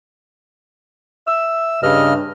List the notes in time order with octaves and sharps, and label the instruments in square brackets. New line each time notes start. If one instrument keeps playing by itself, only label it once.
[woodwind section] E5 E6
[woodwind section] G2 [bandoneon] C#3 D#5 F6